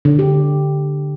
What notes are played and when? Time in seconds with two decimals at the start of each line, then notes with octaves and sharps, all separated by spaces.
0.05 D3
0.19 G4